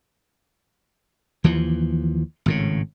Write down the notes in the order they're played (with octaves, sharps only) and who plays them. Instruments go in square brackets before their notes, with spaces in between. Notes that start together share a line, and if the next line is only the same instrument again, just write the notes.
[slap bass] D#2 E3 F3
G#1 A2 C#3